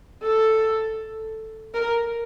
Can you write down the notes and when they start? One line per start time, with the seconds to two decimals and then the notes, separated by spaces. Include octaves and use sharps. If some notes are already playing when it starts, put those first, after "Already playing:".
0.23 A4
1.74 A#4